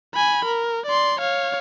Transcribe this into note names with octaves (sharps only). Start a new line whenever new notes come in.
G#5 B5
A#4
D5 C6
C#5 F5